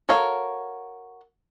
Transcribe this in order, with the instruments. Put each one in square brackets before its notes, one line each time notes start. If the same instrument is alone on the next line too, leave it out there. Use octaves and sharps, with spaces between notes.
[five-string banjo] F#4 A4 A#4 C#5 F5